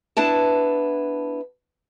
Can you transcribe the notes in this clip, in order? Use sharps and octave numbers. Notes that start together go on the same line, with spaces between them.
B3 D4 E4 A5